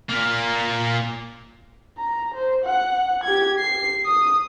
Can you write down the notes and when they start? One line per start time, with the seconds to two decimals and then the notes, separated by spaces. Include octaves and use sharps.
0.09 A#2 A#3
1.98 A#5
2.35 C5
2.64 F#5
3.24 G4 G#6
3.59 C7
4.06 D#6